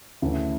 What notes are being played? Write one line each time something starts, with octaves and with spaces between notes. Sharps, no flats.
D2 C#3 E3 A3